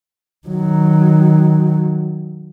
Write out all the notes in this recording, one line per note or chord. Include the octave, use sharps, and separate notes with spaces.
D#3 F#3